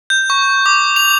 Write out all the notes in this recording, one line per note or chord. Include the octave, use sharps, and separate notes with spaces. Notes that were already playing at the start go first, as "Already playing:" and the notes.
G6
C#6
D6
F7